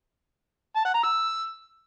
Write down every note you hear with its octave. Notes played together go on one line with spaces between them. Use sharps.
A5
F#5
A#5
E6